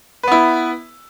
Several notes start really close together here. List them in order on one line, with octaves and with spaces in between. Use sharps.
B4 B3 E4